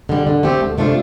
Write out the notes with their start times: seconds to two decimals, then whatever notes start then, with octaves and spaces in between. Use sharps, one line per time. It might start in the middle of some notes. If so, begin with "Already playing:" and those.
0.09 D3 G3
0.27 D3
0.43 A3 C4 G4
0.61 D2
0.78 C3 A3 D4 F4